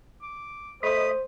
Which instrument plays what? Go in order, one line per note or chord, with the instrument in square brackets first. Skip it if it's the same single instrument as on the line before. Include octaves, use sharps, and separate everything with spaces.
[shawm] D6
[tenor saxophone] A3 [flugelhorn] C5 [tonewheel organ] D#5 B5 [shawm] D#6